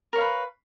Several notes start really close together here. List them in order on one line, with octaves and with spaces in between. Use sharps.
A#4 C#5 F5 B4